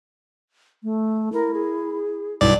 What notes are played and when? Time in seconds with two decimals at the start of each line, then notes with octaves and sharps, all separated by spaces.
0.83 A3
1.33 E4 A#4
1.53 G#4
2.41 B1 G2 E4 D5